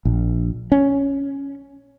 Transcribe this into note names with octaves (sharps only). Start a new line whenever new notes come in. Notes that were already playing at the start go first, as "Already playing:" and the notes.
A#1
C#4